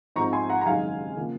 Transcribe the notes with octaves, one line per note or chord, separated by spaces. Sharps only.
G#2 F3 C4 A#5 C#6
G#5 C6
F#5 A#5
A#5
F#1 F#2 D#3 G#3 F5 G#5
C#3 F3 A#3